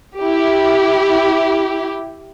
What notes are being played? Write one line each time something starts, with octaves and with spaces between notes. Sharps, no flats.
E4 G4